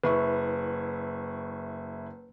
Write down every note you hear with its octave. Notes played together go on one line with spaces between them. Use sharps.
F#1 E4 B4 C#6